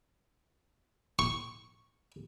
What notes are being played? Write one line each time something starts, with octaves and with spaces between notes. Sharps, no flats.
C#6